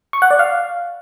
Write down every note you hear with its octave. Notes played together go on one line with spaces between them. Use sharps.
C#6
F#5
D5
F5